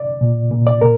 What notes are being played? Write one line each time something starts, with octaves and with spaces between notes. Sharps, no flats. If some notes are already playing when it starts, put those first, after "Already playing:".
Already playing: D5
A#2
A#2
D5
A#2 A#4